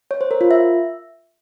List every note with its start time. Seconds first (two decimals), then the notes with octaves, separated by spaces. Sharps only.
0.11 C#5
0.21 C5
0.31 A#4
0.41 F4
0.51 E5